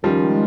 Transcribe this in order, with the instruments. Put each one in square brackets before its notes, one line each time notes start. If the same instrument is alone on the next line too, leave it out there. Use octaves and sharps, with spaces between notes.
[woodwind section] D#3 G#3 C#4 [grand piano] F3 G3